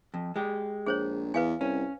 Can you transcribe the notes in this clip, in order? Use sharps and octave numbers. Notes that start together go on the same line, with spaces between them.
F2
G#3 G4
A#1 G#4 C5 C#5
E2 B4 F5 G#5
C2 C#4